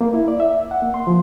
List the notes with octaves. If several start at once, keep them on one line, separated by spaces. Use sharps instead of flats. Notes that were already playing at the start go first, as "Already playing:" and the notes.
A#3
E4
D5
E5
F#5
A#3
C6
F3